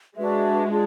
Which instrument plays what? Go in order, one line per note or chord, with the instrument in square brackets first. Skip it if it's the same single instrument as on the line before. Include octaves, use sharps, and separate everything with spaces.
[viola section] G#3 [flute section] D4 F#4 B4 E5
[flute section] D4 F4 G#4